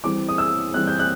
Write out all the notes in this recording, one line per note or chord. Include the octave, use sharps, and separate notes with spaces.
E3 G3 C4 D6
D#6
E6
E3 G3 C4 F#6
G6
F#6